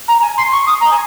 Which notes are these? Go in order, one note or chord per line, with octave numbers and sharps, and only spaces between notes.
A#5
G#5
C6
C#6
D#6
A#5
G#5